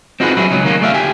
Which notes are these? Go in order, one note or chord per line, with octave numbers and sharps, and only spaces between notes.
C4 D#4 F4 F#4 G#4 B4
F#3 G3 C4 E4 G#4
C#2 F#3 D#4
D#3 F#3 A#3 C#4
A3 D5 E5 F5
D2 G4 G#5